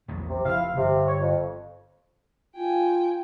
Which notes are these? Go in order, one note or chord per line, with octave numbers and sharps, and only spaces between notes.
A#1 E2 F#3
C3
F1 F3 E4 E5 F5
G1 C3
C#5
F2
F4 G5 G#5